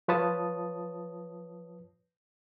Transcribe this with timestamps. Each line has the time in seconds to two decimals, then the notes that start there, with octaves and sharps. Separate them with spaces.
0.08 F3 F4 B4 C#5 A5 D#6